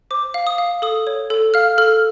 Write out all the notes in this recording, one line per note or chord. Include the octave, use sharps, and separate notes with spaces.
C5 D6
F5
D#6
F5
A4 D#6
C#5
A4
F5 F6
A4 F6